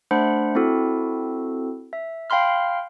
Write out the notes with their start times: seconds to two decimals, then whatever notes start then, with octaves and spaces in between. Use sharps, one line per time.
0.11 A3 D4 C5 F#5 B5
0.55 C4 E4 F#4 A4
1.93 E5
2.30 F5 G5 B5 C6 F6